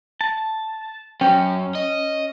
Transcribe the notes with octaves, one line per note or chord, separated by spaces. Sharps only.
A5
F#2 C#4 G5
D#5